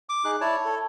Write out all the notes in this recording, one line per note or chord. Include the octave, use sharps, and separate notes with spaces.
D6
D#4 G#4 F#6
E4 C#5 D5 A5
A4